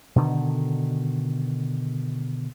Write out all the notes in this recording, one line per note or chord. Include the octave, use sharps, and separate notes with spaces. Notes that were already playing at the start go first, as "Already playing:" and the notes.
B2 D3 D#3